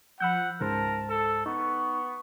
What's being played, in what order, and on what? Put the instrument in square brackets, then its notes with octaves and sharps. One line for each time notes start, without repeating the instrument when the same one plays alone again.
[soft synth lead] F3 [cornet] F#5 [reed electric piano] B5 E6 G6
[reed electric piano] C#2 G#2 C5 [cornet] A#4 [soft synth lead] A5
[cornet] A4 [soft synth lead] E6
[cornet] B3 [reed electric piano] D#4 [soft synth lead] C#6